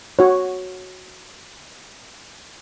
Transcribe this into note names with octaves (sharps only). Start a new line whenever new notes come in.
F#4 C#5